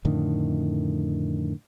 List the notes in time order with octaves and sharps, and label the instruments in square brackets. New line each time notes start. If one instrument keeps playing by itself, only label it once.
[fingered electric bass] F2 A2 D3 D#3